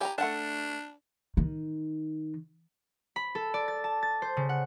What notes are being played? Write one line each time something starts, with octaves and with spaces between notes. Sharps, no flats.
G4 G#5 A#5
A3 D4 F#5 A5
D#3
B5
A4
D5
A6
A5
A6
C5
C#3
F#5